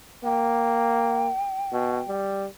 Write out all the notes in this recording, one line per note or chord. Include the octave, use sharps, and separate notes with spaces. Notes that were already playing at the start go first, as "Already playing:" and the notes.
A#3 G5
B2
G3